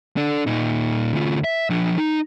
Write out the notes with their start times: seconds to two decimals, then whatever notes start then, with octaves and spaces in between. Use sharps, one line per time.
0.17 D4 A4
0.47 A#2 D#4
1.14 D2 F4
1.44 E5
1.70 F3 D4
1.98 D#4